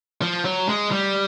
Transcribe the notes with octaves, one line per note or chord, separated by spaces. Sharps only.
F3
F#3
G#3
G3